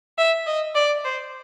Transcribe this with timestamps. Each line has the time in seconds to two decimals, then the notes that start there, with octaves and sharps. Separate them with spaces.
0.18 E5
0.47 D#5
0.75 D5
1.05 C5